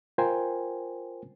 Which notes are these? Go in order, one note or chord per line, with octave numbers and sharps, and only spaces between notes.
F4 A#4 C5 G5 G#5